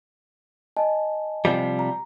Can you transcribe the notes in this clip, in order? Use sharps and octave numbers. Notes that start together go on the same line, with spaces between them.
D#5 G#5 A5
C3 F3 G3
A#5